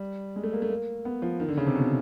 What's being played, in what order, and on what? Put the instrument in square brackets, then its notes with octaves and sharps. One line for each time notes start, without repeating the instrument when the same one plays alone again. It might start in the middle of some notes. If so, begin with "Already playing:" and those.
Already playing: [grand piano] G3
G#3
A3
A#3
A3
A#3
B3
F3
D#3
D3
C#3
C3
B2